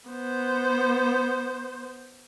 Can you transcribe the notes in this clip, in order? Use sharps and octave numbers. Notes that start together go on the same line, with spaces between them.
B3 C5